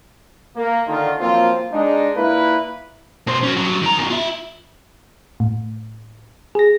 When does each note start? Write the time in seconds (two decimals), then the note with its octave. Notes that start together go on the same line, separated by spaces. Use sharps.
0.56 A#3
0.87 D3 D#3 F4
1.20 F3 F#3 A#3 C4 F4
1.72 G#3 D4 D#4
2.17 A#2 A#3 E4 B4
3.27 B2 C5
3.43 C#4 F#4
3.56 G2 F#3
3.82 D#3 A#5
3.98 F#2 B2
4.10 F4 E5
5.40 A2
6.55 G#4 A#6